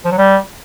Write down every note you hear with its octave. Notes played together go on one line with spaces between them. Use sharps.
F3
F#3
G3